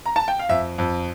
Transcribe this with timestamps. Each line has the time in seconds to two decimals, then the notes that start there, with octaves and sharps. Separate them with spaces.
0.06 A#5
0.16 A5
0.28 G5
0.39 F5
0.49 F2 E5
0.78 F2